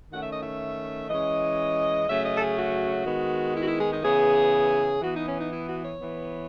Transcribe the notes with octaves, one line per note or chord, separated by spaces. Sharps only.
D#3 A3 C#4 F#5
E5
D#5
E5
E3 G#3 C#4 D#5
C#3 F#3 A3 C#4 E5
D#5
A4
G#4
F#4
D#3 G#3 B3
E4
F#4
E4
G#4
D#4
C#3 E3 B3 G#4
E3 B3 F#4
D#4
C#4
D#4
E4
F#4
C#5
E3 B3